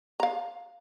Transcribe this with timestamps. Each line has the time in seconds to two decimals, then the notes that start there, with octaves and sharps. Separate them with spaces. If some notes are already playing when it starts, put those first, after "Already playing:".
0.20 F5 A#5